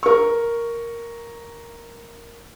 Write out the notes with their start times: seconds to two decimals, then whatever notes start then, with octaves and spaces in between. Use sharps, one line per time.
0.03 A#4 C#6